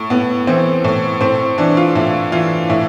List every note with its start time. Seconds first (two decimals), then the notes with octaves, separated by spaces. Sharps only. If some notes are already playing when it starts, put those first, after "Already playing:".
Already playing: A2
0.10 A2 B3
0.47 E3 C4
0.84 A2
1.21 A2 C4
1.58 E3 D4
1.77 F4
1.95 A2 E4
2.32 E3 F4
2.70 A2 E4